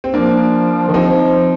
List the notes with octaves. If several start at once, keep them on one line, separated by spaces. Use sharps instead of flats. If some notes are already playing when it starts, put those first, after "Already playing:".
C4
F3 A#3 D4
D#3
F3 C4 D#4